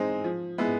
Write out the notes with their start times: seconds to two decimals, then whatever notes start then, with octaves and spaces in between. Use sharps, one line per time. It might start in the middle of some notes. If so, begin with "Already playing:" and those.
Already playing: E3 G#3 C4 D#4
0.24 F3
0.58 G#3 B3 E4